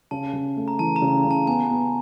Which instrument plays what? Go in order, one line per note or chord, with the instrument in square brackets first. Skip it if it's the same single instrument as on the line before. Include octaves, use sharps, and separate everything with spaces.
[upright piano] C#3 [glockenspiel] A5
[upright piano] C#3
A3
[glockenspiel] A#5
[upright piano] E3 [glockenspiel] A5
[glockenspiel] A#5
[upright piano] C#3
C#3
[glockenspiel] A5
[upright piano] B3 [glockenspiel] G#5
[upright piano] B3